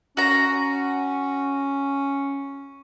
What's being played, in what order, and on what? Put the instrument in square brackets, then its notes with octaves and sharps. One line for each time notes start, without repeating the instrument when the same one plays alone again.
[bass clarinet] C#4 [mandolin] F#4 A#5